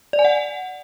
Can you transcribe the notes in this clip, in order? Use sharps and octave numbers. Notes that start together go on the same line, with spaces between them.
D5
G#5
F#5